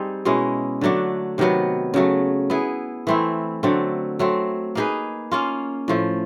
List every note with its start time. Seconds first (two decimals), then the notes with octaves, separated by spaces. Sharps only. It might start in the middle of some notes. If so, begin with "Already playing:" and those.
Already playing: G3 C4 D#4 G#4
0.25 B2 G#3 C#4 E4
0.81 D3 F#3 A3 D4
1.38 C3 D#3 F#3 B3
1.94 C#3 F#3 A3
2.50 B3 E4 G#4
3.07 E3 A3 C4 E4
3.63 D3 F#3 A3 C4
4.19 F#3 A3 C4
4.75 A#3 D#4 G#4 B4
5.31 A#3 C#4 F4
5.88 A2 F3 A3